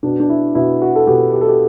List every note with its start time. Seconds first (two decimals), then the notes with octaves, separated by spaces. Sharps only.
0.03 B2 D4
0.20 D4
0.30 E4
0.55 B2 E4
0.82 F#4
0.95 A4
1.07 B2 G4
1.33 G4
1.41 A4
1.48 G4